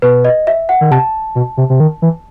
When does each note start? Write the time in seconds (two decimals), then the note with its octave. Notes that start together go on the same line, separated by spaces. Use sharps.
0.02 B2 B4
0.25 D#5
0.47 E5
0.69 F#5
0.81 D#3
0.91 C3 A5
1.35 B2
1.57 C3
1.70 C3
1.80 D#3
2.02 E3